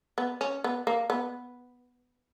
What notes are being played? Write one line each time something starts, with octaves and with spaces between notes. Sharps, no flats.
B3
C#4
B3
A#3
B3